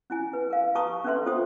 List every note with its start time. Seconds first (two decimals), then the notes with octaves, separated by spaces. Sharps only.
0.10 C#4 E4 G#5
0.33 B4
0.50 A#4 F5
0.75 G4 B4 A5 A#5 C#6 D#6
1.04 C#4 D4 A4 B4 E5 C6
1.26 F4 A4 C5 G5 D#6